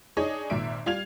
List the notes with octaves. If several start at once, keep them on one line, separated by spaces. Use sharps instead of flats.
D4 D#4 G#4 C#5 D#5
G#1 A#2 E5 D7
G3 F4 F5 G#6 F7